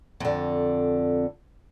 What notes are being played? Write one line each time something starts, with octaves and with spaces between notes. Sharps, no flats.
F2 D3